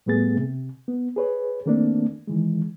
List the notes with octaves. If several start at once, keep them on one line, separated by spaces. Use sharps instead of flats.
A2 G3 A3 B3 G#4 A6
C3
B3
G#4 B4 C#5
D#3 A3 A#3 C4 D4
D#3 E3 G#3